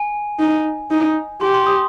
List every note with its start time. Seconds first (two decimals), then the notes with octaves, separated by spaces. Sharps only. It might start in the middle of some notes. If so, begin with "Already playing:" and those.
Already playing: G#5
0.39 D#4
0.91 D#4
1.41 G4 C6
1.54 C6
1.67 D#6